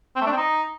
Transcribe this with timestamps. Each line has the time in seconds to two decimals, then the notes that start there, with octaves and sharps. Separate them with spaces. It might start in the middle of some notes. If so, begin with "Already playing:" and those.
0.16 C4
0.21 A3
0.27 D4
0.32 C4
0.37 D#4